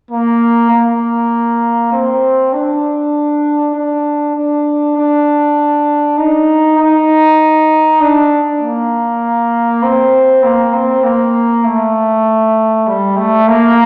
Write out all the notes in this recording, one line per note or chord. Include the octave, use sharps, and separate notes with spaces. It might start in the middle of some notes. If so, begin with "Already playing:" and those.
A#3
A#3
C4
D4
D4
D4
D4
D#4
D#4
D4
A#3
C4
A#3
C4
A#3
A3
G3
A3
A#3